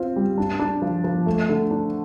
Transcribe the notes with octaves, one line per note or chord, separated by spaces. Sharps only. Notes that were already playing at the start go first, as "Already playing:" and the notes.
Already playing: C4 F4
G3
D4
D4
F3
F3
A3
D3
D4